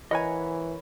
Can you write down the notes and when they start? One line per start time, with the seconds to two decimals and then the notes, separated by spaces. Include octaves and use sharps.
0.11 E3 A#4 C#5 D#5 F#5 G#5 B5